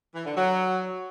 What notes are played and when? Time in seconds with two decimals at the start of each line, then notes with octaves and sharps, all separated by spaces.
0.15 E3
0.26 D3
0.37 F#3